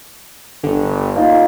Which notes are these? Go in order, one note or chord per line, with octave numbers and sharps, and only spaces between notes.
G1 D3
A#3 D#4 F4